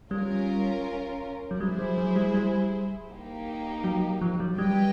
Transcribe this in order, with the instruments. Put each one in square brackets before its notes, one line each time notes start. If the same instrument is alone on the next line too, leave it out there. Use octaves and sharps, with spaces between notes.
[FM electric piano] G3 [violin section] C#4 F4 A#4
[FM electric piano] F#3
[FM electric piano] G3 [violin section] E4 G#4 C5
[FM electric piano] F#3
F#3
G3
G3
[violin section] A#3 D#4 G4
[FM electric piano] F#3
F3
F#3
[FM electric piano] G3 [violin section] G4 B4 D#5 G5